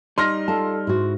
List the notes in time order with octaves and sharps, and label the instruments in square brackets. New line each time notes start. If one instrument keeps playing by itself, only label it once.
[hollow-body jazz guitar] G3 D#4 [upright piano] C6 F6 A#6
[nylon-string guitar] F4 A5 [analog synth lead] A4
[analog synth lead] G#2 [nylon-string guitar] E4 F#4